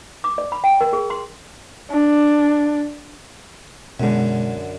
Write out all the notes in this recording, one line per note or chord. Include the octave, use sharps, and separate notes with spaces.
D6
D5
B5
G5
A#4
G#4
C6
D4
F#2 B2 D3 G#3